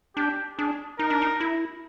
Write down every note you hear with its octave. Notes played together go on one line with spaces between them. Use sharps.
D4 G4
D4 G#4
D#4 A#4
D4
D#4
E4